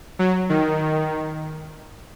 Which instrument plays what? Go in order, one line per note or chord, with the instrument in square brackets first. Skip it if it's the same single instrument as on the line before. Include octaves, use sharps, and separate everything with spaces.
[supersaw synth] F#3
D#3